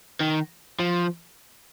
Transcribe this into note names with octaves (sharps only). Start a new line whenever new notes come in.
D#3
F3